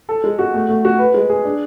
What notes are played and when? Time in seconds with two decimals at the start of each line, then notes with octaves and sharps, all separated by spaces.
0.09 A4
0.24 G#3
0.39 F#4
0.54 A3
0.69 A3
0.85 F#4
0.99 B4
1.14 G#3
1.30 G#4
1.45 D4